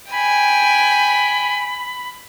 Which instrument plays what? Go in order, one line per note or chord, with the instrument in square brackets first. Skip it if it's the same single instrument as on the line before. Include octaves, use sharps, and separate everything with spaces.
[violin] G5 G#5 [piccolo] B5